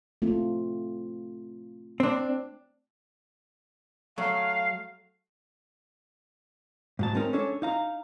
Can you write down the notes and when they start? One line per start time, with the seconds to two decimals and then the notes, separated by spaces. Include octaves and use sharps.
0.22 A3 C4 F4
2.00 C4 D4
4.18 F#3 A3 F5
6.99 G#2 F#3 A5
7.14 G#3 C4 C#4 D#4 A#4
7.33 C#4 D4 A4 C#5
7.62 D#4 F5 A#5